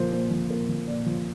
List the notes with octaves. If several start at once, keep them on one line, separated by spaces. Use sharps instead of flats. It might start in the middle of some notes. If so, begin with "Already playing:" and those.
Already playing: A#2 F3 A#4 C5
A#2 C5
F3
A#2 A#4
F3
A#2 D5
F3